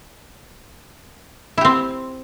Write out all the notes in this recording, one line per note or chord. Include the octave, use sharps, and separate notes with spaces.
C4 E4 G4